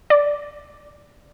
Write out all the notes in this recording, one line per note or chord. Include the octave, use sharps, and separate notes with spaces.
D5